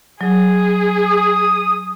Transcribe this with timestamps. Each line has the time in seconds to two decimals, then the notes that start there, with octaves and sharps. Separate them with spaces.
0.21 F#3 G#4
1.06 D#6